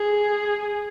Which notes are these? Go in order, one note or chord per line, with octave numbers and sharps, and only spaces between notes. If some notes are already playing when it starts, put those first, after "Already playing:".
Already playing: G#4